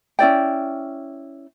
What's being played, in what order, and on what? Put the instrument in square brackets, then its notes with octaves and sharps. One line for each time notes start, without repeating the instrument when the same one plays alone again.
[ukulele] C#4 E4 D5 G5